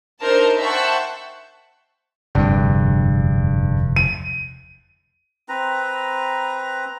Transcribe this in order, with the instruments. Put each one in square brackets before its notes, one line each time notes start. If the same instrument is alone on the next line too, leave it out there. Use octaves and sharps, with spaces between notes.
[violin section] D4 D#4 A#4 C5 A5
C5 E5 F#5 G5 A5 C#6
[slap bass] F1 E2 D3 [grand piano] G2
[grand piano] D#7
[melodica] C4 B4 A#5